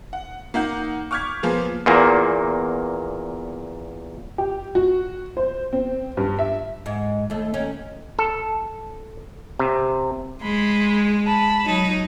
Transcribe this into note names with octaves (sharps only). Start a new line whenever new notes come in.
F#5
A#3 D#4 F#5 G6
C#6 D6 F6 G6 G#6 B6
F3 A#3 B3 F4 G#4
E2 A#2 A#3
G4
F#4
C5
C4
G2
E5
G#2
D#2 A3
D#3 C#4
A4
C3
G#3 B5 C6
A5 B5
F#3 D#4